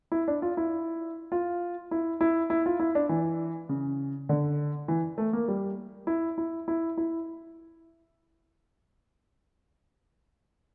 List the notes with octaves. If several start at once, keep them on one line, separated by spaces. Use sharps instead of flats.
E4
D4
F4
E4
F4
E4
E4
E4
F4
E4
D4
E3
C#3
D3
E3
A3
A#3
G3
E4
E4
E4
E4